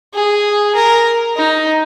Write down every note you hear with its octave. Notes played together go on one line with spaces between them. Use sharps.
G#4
A#4
D#4